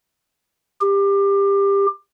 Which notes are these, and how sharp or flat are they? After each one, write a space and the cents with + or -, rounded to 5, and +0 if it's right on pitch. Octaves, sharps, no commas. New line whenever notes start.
G4 +20